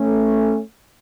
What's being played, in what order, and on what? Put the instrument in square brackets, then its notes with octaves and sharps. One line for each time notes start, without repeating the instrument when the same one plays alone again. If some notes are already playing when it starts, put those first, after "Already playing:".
Already playing: [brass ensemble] A3 C#4